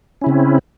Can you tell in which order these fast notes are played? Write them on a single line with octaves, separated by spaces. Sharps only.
C#4 E4 C#3 C4